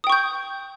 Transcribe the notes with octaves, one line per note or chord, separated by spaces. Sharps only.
G5 C#6 D#6 G6